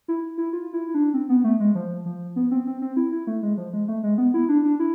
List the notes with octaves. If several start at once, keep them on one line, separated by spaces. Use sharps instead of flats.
E4
E4
F4
E4
E4
D4
C4
B3
A3
G#3
F3
F3
B3
C4
C4
C4
E4
E4
A3
G#3
F3
G#3
A3
G#3
B3
E4
D4
D4
E4